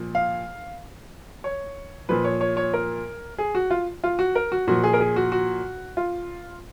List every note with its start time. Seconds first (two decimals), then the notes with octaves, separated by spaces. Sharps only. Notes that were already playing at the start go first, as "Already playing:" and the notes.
Already playing: A#2 F3
0.15 F5
1.44 C#5
2.09 A#2 F3 B4
2.25 C#5
2.41 C#5
2.57 C#5
2.74 A#4
3.38 G#4
3.55 F#4
3.70 F4
4.04 F4
4.19 F#4
4.35 A#4
4.52 F#4
4.67 A#2 F3 F#4
4.84 G#4
4.93 A#4
5.00 G#4
5.16 F#4
5.32 F#4
5.97 F4